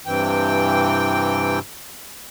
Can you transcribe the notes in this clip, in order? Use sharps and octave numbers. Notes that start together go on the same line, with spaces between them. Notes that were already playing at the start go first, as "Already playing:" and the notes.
G2 C3 E3 G5